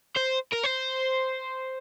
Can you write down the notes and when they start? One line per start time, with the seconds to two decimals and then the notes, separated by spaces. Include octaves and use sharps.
0.16 C5
0.52 A#4
0.63 C5